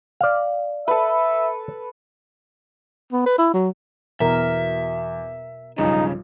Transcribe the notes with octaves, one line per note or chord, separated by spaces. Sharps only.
D5 F5
A4 B4 E5
B3
B4
E4
F#3
E2 B2 A#4 E5
B1 G2 C#3 F3 D#4